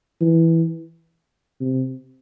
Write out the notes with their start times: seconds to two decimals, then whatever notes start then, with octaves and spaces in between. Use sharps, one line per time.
0.21 E3
1.60 C3